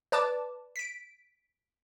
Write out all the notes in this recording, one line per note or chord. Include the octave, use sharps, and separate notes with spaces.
B4 D5 A5 D6
B6 D7